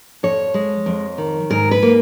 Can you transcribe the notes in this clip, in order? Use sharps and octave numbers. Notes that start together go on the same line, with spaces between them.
F2 C#5
G#3
F2
D#3
G#2 A#4
B4
A#3